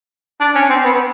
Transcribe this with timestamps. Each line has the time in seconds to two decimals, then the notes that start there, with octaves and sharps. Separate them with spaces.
0.41 D4
0.55 C#4
0.70 C4
0.84 B3